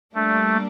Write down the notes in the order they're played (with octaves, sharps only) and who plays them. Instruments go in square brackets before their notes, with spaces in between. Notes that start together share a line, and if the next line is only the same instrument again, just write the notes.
[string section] G3 A#3 D4 [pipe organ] A3